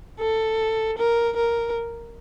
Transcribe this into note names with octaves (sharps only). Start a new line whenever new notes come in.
A4
A#4
A#4